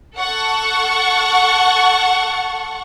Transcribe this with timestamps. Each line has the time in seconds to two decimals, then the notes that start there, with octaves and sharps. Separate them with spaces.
0.16 A4 F#5 C#6